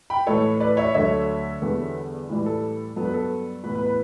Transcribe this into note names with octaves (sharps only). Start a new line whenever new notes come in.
G5 B5
A2 E3 A3 A4 C#5
B4 D5
C#5 E5
D2 D3 F#3 A3 C#5 E5
E2 D3 G3 B3
A2 E3 G3
A4
G2 F#3 B3 A4
B4
A4
A2 E3 B3 B4
B4
B4